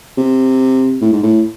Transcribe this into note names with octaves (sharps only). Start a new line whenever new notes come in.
C3
A2
G#2
A2